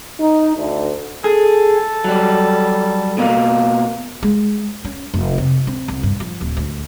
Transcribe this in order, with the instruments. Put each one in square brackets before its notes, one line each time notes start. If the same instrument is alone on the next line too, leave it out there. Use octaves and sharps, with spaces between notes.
[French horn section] D#4
D2
[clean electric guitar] G#4 [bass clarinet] A4
[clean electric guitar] F#3 G3
B2 A#3
[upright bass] G#3
C#4
F1
C3
C4
C2
G2
F3
D1
D2